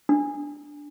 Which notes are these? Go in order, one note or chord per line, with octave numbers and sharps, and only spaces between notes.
D4